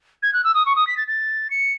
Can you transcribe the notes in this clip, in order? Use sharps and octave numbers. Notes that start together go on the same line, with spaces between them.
G#6
F#6
E6
D#6
C#6
D#6
B6
A6
A6
C#7